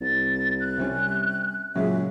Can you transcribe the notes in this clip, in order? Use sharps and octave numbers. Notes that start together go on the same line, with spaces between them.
C2 A6
F#6
C3 G3 C#4
A#2 C#3 F#3 G#3 E5